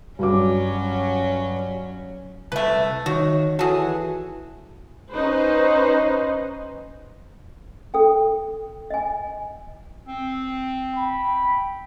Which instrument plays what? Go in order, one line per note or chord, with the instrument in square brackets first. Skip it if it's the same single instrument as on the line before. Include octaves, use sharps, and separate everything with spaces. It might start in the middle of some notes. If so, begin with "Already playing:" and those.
[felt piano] G2 F#4 D6 [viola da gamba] F#3 C#4
[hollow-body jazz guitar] C2 E5 [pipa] A3 B4
[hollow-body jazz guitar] D#3 [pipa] F#4 [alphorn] C#5
[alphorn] E3 [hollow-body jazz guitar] F#4 [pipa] G#4 A4
[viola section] C#4 D#4 B4 C5
[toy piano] A4 G5
D#5 G#5
[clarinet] C4
[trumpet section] G5 B5